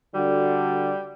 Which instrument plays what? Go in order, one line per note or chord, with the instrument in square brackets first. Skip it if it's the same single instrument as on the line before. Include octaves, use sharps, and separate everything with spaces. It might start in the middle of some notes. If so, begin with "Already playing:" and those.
[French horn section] D3 D4 F#4 [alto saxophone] G3